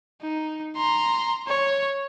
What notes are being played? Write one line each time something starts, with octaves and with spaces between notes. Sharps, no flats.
D#4
A#5 C6
C#5